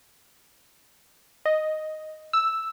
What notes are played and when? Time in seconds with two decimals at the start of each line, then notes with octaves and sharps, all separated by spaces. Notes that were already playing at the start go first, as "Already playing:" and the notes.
1.45 D#5
2.33 E6